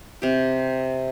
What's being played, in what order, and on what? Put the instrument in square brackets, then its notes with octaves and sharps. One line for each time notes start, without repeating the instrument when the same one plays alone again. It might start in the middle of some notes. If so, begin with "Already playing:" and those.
[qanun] C3 G4